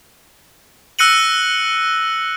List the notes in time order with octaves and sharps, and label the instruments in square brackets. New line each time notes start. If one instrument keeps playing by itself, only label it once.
[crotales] E6 F#6 A#6 C#7 D#7 F#7